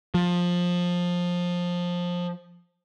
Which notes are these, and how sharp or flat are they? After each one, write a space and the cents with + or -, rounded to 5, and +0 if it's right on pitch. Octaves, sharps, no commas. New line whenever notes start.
F3 +15